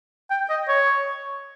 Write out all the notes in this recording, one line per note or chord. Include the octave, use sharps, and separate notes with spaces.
G5
D#5
C#5